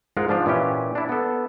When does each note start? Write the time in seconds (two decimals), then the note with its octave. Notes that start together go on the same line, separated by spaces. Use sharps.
0.17 G#2 G#3 F4 A#4 F#5
0.28 G#2 F3 D4 F4
0.46 A#2 E3 C#4 G4
0.95 D4 E4
1.09 B3 A4